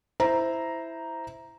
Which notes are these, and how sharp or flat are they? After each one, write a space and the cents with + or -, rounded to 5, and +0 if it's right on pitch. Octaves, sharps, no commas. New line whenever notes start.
E4 +0 C5 -10 A#5 +0